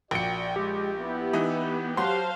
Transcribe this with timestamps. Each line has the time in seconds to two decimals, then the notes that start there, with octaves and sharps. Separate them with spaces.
0.11 A#1 F#4 D5 G5 C#7
0.56 G#3 G4
1.00 B3 E4
1.33 E3 D#4
1.97 F#3 F#4 C5 F5 A5 C6